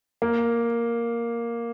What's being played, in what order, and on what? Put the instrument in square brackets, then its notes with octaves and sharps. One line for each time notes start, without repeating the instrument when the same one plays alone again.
[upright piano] A#3